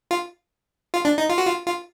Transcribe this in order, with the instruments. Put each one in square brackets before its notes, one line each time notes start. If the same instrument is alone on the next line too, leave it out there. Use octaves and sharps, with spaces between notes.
[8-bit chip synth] F4
F4
D4
D#4
F4
F#4
F4
F4